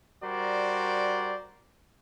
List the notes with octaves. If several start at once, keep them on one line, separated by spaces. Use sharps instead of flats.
G3 F#4 A#4 C5 D5